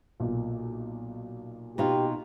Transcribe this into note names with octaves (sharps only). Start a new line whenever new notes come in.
B1 A#2
B2 D#4 F4 G4